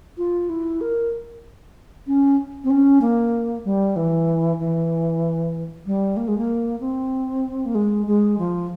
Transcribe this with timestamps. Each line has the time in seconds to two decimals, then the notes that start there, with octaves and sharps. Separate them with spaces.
0.18 F4
0.49 E4
0.81 A#4
2.07 C#4
2.64 C4
2.70 C#4
3.01 A#3
3.65 G3
3.96 E3
4.59 E3
5.86 G3
6.17 A#3
6.28 G#3
6.38 A#3
6.80 C4
7.65 A#3
7.75 G#3
8.07 G#3
8.38 F3